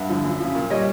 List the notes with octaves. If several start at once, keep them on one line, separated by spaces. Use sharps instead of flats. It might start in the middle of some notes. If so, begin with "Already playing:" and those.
Already playing: G2 E5 F#5
D3 F3
F#2
C#3 F3
A#2
G3 C#5 D#5